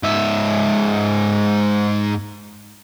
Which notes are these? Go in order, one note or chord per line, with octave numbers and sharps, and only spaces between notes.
G#2 E5